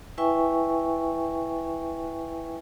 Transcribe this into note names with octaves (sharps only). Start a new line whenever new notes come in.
E4 B4 E5 G5 G#5 C#6